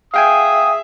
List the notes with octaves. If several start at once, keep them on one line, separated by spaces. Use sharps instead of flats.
G#4 E5 F5 G5 G#5 D#6